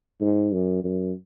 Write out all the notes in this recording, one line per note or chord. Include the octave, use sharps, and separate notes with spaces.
G#2
F#2
F#2